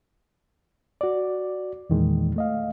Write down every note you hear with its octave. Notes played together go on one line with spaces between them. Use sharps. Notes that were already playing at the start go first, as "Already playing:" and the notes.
F#4 D5
E2 A#2 D#3 E3 G#3
A3 D#5 F5